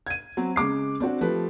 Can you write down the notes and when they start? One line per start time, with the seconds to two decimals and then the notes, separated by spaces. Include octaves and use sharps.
0.07 G#6 D#7
0.37 F#3 C4
0.56 C#3 G#3 D6 C7
1.00 C4 D4 F#4
1.21 F3 A3 G4 B4